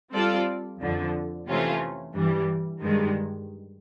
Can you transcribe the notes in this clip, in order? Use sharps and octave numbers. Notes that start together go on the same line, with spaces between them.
G3 C4 F4 A4 D5
F2 D3 F3
C3 E3 A3 C#4 F4
G2 E3 G3
G2 D#3 G#3